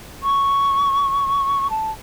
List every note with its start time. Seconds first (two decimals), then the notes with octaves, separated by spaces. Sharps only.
0.23 C#6
1.70 A5